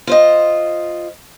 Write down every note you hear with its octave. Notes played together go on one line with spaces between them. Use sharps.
F4 C5 D#5